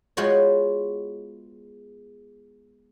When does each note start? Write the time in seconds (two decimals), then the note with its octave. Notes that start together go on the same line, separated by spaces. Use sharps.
0.17 G#3 B3 F4 F#4 C5 C#5